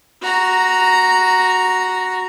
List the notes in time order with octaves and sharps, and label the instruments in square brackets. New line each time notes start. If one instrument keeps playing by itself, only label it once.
[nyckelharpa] F#4 A#5